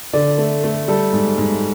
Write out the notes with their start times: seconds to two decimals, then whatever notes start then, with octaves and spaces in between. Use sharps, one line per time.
0.13 D3 D5
0.38 A3
0.64 A3
0.88 G3 A4
1.13 G#2
1.38 G#2